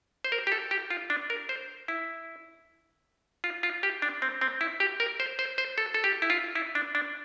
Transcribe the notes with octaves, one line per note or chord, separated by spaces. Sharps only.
C5
A#4
G4
A4
G4
F4
D4
A#4
C5
E4
F4
F4
G4
D4
C4
C4
E4
G4
A#4
C5
C5
C5
A4
A4
G4
E4
F4
E4
D4
D4